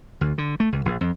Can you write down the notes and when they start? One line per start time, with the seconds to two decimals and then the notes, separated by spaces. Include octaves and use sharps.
0.21 D2
0.38 D3
0.60 A3
0.72 C#2
0.85 A#1
1.01 F2